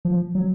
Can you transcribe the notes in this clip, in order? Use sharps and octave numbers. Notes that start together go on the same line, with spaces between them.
F3
F#3